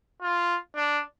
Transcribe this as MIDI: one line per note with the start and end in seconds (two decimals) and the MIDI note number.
0.22 0.56 65
0.75 1.02 62